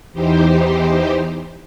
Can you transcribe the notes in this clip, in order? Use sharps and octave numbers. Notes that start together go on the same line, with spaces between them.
E2 E3 D#4 G4 C5